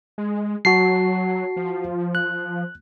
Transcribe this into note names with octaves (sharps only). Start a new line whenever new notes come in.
G#3
F#3 F#4 A5 C7
F3
F#6